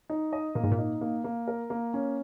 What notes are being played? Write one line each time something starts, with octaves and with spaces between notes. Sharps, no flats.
D#4
D#5
A#2 A#3
G#2
A#2
D#4
A#3
A#3
A#4
A#3
C#4